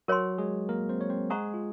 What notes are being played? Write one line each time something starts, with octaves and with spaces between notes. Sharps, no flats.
F#3 F#4 A#4 C#5 G#5 C6
G#3 G#4
A#3 A#4
C4 C5
C#5
C4 C5
G#3 G#4 C5 F#5 A#5 C#6
F4